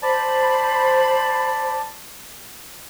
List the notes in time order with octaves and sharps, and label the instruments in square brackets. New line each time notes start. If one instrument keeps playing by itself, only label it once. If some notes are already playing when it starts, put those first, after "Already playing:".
[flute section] C5 B5 [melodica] D5 A5